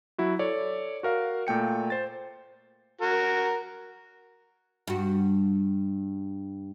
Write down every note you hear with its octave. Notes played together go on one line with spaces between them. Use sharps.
F#3 E4 F#4
A4 C#5 D5
F#4 A#4 F5
A#2 A3 G5 C#7
C5 A6
F#4 A#4
G2 F#4